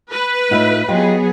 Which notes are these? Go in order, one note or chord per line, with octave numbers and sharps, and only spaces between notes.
B4
A2 D#4 F4 E5
F#3 B3 F4 G4 G#4 D#5